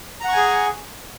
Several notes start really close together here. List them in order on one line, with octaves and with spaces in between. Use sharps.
A#5 F#5 C#6 G#5 G#4